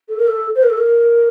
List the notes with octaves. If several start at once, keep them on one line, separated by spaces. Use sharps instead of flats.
A4
A#4
A4
C5
A#4
A4
A#4